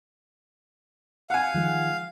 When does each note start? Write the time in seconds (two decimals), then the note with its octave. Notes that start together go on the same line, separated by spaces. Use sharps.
1.30 F5 F#5 G#5
1.54 D#3 F3 G#3